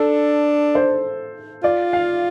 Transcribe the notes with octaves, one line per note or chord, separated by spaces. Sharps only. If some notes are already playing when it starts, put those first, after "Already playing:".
Already playing: D4 A4
C5
F4 D5
F5